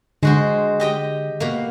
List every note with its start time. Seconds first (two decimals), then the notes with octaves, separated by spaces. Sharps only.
0.23 D3 G#3 F#4 C5
0.80 G4 D#5 G5
1.40 B2 A#3